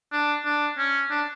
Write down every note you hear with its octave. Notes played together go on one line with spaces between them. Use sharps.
D4
D4
C#4
D4